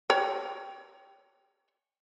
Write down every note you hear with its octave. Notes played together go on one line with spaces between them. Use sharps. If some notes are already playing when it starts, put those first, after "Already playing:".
C#5 G5